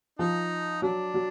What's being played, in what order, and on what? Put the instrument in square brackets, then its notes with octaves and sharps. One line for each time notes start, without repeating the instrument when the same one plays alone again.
[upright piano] F3 [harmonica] D#4
[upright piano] F#3 [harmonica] D4
[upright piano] F#3